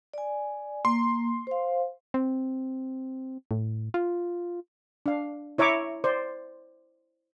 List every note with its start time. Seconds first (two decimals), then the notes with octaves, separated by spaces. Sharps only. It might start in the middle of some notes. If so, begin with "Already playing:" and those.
0.14 D5 G#5
0.85 A#3 C6
1.47 C5 F5
2.14 C4
3.51 A2
3.94 F4
5.06 D4 F5
5.58 E4 C#5 E5 A#5 D6
6.04 C5 D5